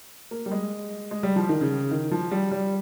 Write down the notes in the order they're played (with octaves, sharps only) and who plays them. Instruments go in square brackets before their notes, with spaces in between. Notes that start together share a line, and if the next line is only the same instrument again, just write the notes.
[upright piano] A#3
G3
G#3
G#3
G3
F3
D#3
C#3
D#3
F3
G3
G3